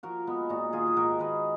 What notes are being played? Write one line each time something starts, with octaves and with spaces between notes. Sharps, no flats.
F3 F#4 A#4
G#3 B3
A#2 D#4 F#4
D#3 F4 G#4
G#4
G#2 F#4 A#4
D#3 G#4 B4